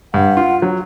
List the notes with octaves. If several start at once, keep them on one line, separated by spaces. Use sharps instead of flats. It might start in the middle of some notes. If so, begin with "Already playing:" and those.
G2 F#5
F4
F#3